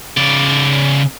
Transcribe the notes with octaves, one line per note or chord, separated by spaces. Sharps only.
C#3 D5